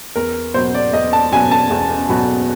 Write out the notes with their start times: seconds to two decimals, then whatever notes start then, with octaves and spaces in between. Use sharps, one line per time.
0.16 E2 A#4
0.54 B2 F#3 B3 C5
0.75 D5
0.93 E2 D#5
1.13 A5
1.32 B2 F#3 B3 G#5
1.51 A5
1.70 E2
2.09 B2 F#3 B3